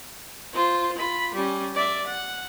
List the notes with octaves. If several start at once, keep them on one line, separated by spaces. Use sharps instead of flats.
F4 C5
F4 B5
G3 C#4
D5 E5
F#5